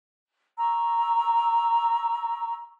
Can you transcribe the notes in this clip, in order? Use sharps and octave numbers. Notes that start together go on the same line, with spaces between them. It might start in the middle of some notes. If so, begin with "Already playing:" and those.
A#5 C#6 E6